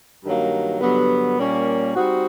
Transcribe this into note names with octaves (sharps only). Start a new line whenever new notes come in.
G2 D#3 F#3 A#3
G2 D3 F#3 B3
A#2 G3 A#3 C#4
G3 C4 D#4 F#4